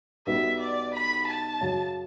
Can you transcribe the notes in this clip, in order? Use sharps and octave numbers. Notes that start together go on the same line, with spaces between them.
B1 B2 G3 B3 E5
D5
B5
A5
F#2 C#3 F#3